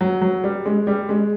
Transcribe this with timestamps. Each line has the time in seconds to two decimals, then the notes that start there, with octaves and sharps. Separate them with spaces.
0.01 F#3
0.21 F#3
0.44 G3
0.66 G#3
0.87 G3
1.09 G#3